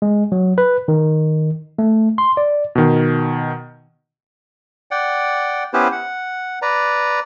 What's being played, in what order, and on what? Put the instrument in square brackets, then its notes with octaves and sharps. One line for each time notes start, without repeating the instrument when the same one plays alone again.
[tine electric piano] G#3
F#3
B4
D#3
A3
C6
D5
[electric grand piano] B2 D#3
[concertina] D5 F#5 G5
B3 C#4 E4 G4 B4 C5
F#5
B4 D5 A#5